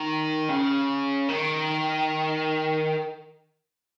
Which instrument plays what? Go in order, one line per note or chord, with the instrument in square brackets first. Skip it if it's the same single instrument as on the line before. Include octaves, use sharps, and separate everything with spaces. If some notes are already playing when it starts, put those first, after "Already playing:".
Already playing: [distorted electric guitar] D#3
C#3
D#3